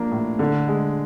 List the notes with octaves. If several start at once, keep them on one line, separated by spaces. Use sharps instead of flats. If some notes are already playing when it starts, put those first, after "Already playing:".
Already playing: F3 A#3 D4
A2
D3
G#3